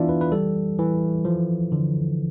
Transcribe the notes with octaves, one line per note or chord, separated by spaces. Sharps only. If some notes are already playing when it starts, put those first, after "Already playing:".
Already playing: E3 B3 D4 E4 F4 D5 E5 F5
B4
B4
G3 A4
E3
F3
D3